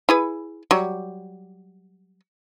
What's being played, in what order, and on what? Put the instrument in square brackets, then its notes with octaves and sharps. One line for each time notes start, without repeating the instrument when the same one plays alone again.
[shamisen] E4 G#4 B4
F#3 G3